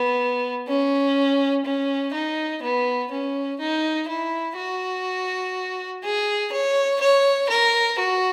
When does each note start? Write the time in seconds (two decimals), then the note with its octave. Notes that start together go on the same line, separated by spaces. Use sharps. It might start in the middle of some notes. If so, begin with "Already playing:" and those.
Already playing: B3
0.68 C#4
1.65 C#4
2.13 D#4
2.63 B3
3.11 C#4
3.60 D#4
4.08 E4
4.57 F#4
6.04 G#4
6.52 C#5
7.01 C#5
7.49 A#4
7.99 F#4